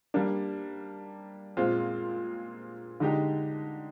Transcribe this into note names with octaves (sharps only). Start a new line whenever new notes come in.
G3 A#3 D4
A#2 G#3 C4 F4
D3 G#3 D#4 G4